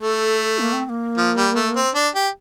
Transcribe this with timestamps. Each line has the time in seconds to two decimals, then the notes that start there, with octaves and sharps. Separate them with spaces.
0.02 A3 A4
0.59 A#3
0.73 C4
0.86 C4
0.89 A#3
1.17 F3
1.37 G3
1.56 A3
1.76 C4
1.95 D4
2.15 G4